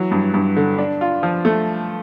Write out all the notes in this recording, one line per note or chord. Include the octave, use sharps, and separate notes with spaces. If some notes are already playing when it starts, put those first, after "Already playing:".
Already playing: E3 F#3
G2
G2
D3
D4
F4
F3
A3